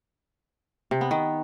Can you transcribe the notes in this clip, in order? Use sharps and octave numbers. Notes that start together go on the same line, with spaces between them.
C3
B3
D#3